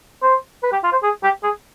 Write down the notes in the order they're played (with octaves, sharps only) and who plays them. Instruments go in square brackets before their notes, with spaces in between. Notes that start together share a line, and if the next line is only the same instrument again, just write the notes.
[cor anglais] C5
B4
G4
F4
C5
G#4
G4
G#4